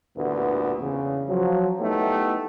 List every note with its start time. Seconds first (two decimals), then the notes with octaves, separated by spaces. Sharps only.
0.16 A1 D2 G2 A#2 B3
0.80 E2 C#3
1.29 F3 F#3
1.79 A3 B3 D#4 E4 G4